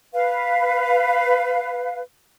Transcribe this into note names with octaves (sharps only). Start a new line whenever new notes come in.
B4 F5